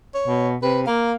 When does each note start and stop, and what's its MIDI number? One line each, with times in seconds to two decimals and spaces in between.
0.15 0.49 73
0.27 0.55 47
0.62 0.85 48
0.62 0.81 71
0.87 1.13 58
0.87 1.14 77